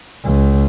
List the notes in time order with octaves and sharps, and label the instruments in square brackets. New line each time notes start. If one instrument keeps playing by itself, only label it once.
[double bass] C#2